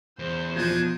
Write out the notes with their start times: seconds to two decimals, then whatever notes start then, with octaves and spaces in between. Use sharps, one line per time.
0.19 E2 C5
0.56 B2 F3 D4 D#4 G#5